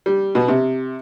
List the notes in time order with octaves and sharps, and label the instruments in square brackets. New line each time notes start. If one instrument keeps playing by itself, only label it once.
[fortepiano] G3
B2
C3